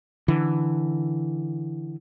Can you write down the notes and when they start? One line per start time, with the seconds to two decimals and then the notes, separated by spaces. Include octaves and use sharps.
0.28 D3 E3